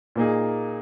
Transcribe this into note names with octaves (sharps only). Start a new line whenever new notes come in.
A#2 A#3 D#4 G#4